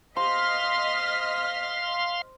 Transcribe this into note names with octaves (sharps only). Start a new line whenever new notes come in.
C5 D#5 F5 C6 F6 B6